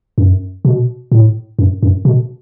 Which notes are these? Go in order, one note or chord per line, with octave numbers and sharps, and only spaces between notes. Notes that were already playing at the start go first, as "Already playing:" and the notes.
F#2
B2
A2
F#2
F#2
B2